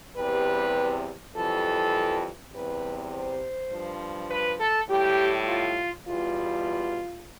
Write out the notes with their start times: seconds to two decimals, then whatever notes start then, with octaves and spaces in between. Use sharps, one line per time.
0.16 E2 C3 G3 B4
1.34 F2 E3 G3 A4
2.52 E2 C3 G3 B4
3.11 C5
3.70 G2 F3
4.29 B4
4.59 A4
4.88 A2 G3 G4
5.47 F4
6.06 E2 B2 G3 F4